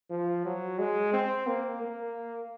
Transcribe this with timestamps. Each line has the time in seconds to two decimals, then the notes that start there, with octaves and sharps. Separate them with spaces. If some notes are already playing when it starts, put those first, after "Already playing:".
0.10 F3
0.45 F#3
0.79 G#3
1.13 C4
1.47 A#3
1.81 A#3